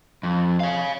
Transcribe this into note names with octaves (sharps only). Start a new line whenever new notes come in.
F2
C#5 F5